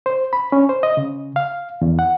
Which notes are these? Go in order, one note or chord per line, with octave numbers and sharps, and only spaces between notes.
C5
B5
C#4
C5
D#5
C#3
F5
E2
F#5